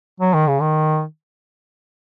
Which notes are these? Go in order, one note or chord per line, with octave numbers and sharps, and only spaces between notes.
F#3
D#3
C#3
D#3